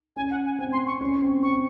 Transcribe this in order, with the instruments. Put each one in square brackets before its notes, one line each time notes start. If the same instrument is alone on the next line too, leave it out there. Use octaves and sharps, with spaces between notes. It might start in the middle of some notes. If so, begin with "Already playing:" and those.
[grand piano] C#4 [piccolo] G#5
[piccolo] F#5
G#5
[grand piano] C4 [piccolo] G#5
[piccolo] C6
C#6
[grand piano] C#4
C4
[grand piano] C4 [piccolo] C#6